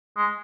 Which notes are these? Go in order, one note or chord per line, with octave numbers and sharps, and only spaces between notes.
G#3